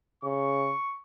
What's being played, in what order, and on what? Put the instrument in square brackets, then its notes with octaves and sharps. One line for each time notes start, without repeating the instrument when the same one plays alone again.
[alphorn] C#3 [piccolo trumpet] C#6